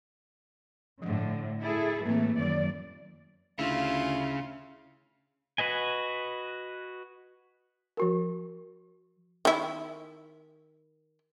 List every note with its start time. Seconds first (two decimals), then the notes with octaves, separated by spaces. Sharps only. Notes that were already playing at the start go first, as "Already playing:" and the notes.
1.02 A2 D3 F3
1.61 E4 G#4 A4
2.06 A2 E3 A3 A#3 C4
2.39 F#2 D#3 F#3 D5
3.59 D2 C#3 E4 F4
5.58 F#4 B4 D#5 G#5
7.97 F3 F#4 A#4
9.45 D#3 E4